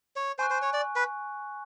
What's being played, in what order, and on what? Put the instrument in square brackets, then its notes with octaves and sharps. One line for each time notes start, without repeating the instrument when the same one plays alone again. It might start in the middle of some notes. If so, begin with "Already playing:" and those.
[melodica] C#5
[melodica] C5 [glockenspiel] G#5 C#6 F#6
[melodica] C5
C#5
D5
B4